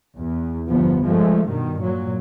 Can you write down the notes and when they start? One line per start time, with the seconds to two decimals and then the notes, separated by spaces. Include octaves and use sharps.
0.16 E2
0.68 G1 F3 B3
1.05 F3 G#3 A3
1.45 G2 B2 D#3
1.82 A#2 F#3